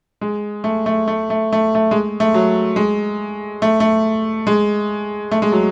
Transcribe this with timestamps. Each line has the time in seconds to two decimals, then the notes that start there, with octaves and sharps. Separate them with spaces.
0.21 G#3
0.64 A3
0.86 A3
1.08 A3
1.30 A3
1.52 A3
1.75 A3
1.91 G#3
2.20 A3
2.34 F#3
2.76 G#3
3.62 A3
3.80 A3
4.47 G#3
5.31 A3
5.42 G#3
5.52 F#3